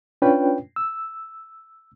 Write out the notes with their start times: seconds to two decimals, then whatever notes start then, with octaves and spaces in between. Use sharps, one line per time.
0.22 C#4 D4 F4 B4 C#5 G5
0.76 E6